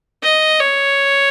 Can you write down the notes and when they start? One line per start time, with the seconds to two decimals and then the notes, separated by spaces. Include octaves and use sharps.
0.23 D#5
0.59 C#5